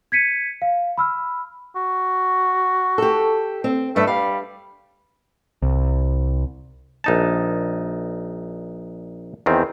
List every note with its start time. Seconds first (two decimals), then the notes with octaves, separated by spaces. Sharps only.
0.12 G#6 B6 C#7 D#7
0.62 F5
0.97 B5 E6 F6
1.76 F#4
2.98 G4 A4
3.64 C4
3.96 G2 A3 B4 E5
4.07 G3 F5
5.62 C2
7.04 A#1 D#4 A5
9.46 E2 D#3 C4